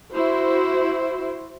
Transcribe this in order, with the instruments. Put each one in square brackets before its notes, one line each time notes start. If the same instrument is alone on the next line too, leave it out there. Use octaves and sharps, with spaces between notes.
[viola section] E4 F#4 C5